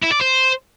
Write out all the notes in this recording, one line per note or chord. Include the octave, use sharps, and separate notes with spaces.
E4
D5
C5